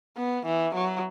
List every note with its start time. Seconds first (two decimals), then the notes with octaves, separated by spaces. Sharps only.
0.17 B3
0.45 E3
0.74 F#3